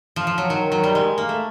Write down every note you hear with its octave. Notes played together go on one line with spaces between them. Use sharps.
F3
F3
F#3
D#3 F#3
F#3
G3
G#3
A#3
A3